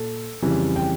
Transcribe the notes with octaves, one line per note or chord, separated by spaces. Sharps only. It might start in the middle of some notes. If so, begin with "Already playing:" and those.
Already playing: A#2 A4
F2 C#3 E3 G3
G5